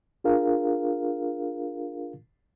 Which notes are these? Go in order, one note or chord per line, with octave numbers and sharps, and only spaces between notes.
D4 F4 G#4 A#4 F5